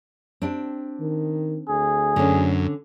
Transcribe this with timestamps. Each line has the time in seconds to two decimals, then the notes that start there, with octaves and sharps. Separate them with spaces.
0.42 C4 D4 G4
1.00 D#3
1.69 D2 G#4
2.16 F#2 D3 C#4